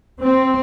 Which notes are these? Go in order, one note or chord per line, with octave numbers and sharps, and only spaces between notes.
C4